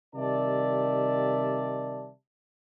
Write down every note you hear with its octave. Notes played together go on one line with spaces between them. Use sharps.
C3 D#3 G3 D5 E5 A5